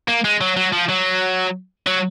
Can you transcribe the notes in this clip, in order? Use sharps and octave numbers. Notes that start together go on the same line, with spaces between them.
A#3
G#3
F#3
F#3
F3
F#3
F#3